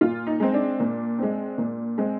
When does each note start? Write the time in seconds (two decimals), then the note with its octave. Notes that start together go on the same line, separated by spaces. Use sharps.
0.01 A#2 F4
0.27 D#4
0.40 G#3 C4
0.54 D4
0.80 A#2
1.19 G#3 C4
1.58 A#2
1.98 G#3 C4